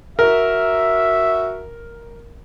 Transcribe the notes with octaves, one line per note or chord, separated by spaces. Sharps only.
F#4 A#4 E5